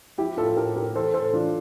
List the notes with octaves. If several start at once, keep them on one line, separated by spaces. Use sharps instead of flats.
F3 E4 G4
A2 F4 A4
A4
A2 G4 A#4
A2 G4 A#4
E3 A4 C5
A2 A4 C5
E3 D4 F4